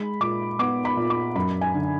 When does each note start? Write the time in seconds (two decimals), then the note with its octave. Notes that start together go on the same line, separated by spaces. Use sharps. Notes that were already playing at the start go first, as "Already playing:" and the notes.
Already playing: G#3 B5
0.21 A#2 D6
0.59 B3 D6
0.85 B5
0.97 A#2
1.10 D6
1.36 F#2 B5
1.61 G#5
1.74 D3